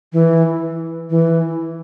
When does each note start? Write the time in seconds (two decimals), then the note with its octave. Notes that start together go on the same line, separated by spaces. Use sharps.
0.13 E3
1.10 E3